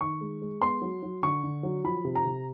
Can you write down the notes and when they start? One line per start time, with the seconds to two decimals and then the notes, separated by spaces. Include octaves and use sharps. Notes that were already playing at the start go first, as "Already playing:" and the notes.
0.01 D#3 C#6
0.21 G#3
0.42 G#3
0.62 B3 C6
0.82 F#3
1.03 F#3
1.23 D3 C#6
1.43 D3
1.63 F#3
1.84 F3 B5
2.05 C3
2.15 A#5
2.25 C3